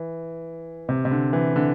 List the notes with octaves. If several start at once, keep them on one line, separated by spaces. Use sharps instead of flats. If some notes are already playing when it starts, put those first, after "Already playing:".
Already playing: E3
C3
C3
D3
E3
D3